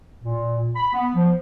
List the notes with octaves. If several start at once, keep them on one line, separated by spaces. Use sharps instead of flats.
A#2
B5
B3
F3